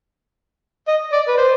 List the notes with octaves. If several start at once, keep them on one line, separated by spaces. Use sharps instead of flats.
D#5
D5
B4
C5